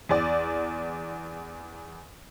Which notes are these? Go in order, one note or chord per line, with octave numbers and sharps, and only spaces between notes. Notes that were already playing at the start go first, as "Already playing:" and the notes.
E2 D5